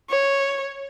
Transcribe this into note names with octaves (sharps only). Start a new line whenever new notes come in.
C#5